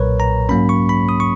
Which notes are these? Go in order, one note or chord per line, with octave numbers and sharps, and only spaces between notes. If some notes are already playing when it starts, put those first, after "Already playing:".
Already playing: B1 A#2 F#3 A#4 B4 C#5
A#5
G#2 F#3 A#3 C#4 B5
C#6
B5
D#6
C#6